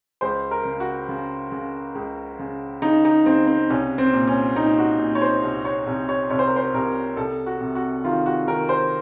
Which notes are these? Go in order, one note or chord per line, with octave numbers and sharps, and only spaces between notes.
C#2 C5
A#4
C#3
F#4
C#3
C#3
C#2
C#3
C#3 D#4
D#4
C#3 C4
C4
C2 C#4
C4
A#2
C#4
A#2 D#4
F#4
A#2
C#5
C5
C2
C#5
C2
C#5
C2 C#5
C5
A#4
C5
C2 A#4
C2 A4
F#4
C3
F#4
D#3 F4
F#4
D#3 A#4
C5